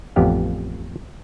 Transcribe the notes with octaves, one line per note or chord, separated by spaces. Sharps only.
A1 F2 B3 G4 F5